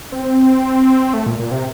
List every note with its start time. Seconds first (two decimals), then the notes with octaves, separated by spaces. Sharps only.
0.12 C4
1.14 A3
1.26 A#2
1.40 A#2
1.51 C3